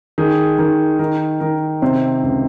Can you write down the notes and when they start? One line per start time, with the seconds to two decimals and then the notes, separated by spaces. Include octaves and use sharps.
0.18 D#3 G#4
0.59 D#3
0.99 D#3 A#4
1.40 D#3 A#4
1.82 C3 C5
2.23 C#2